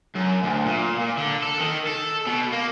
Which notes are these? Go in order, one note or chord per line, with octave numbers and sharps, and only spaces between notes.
F#2
D2
A#2
A#2
D3
A4
D#3
A4
B2
A#3